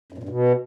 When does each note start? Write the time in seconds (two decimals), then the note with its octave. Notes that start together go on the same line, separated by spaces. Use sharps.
0.13 F#2
0.18 A#2
0.23 G2
0.29 B2